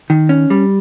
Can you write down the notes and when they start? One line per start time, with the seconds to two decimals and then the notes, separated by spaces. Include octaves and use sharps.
0.10 D#3
0.29 C#4
0.50 G3